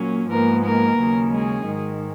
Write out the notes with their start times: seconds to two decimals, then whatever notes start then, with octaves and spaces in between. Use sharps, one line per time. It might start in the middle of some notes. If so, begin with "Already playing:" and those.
Already playing: A#2 F#3 A#3 C#4
0.28 G#2 F3 G#3 A#3 B3 A#4
0.62 A#3 A#4
0.97 D#2 C#3 F#3
1.30 G#3 G#4
1.64 G#2 D#3 G#3